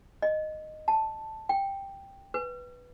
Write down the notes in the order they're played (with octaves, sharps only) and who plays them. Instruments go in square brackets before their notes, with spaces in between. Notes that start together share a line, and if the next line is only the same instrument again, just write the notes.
[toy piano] D#5
A5
G5
B4